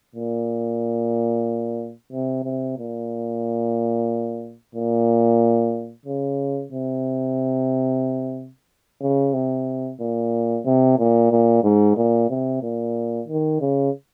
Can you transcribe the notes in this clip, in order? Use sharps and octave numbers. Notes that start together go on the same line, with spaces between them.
A#2
C3
C3
A#2
A#2
C#3
C3
C#3
C3
A#2
C3
A#2
A#2
G#2
A#2
C3
A#2
D#3
C#3